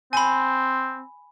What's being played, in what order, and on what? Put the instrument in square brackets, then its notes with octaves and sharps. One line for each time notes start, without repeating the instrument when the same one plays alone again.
[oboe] C4 [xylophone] G#5 B5